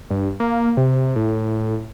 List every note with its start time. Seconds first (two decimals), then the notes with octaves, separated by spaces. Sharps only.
0.10 G2
0.40 A#3
0.77 C3
1.16 A2